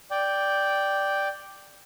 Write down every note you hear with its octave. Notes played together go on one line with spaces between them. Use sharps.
D5 G5